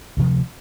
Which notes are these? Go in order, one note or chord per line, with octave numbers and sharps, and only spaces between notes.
D2 C3 F3